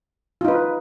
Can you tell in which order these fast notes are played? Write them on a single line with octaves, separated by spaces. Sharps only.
F4 D#4 B4